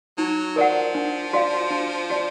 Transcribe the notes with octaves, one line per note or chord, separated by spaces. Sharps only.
F#3 D#4
F3 A#4 D5 F#5
D4
F#4 D5 F5
D4
F#4 D5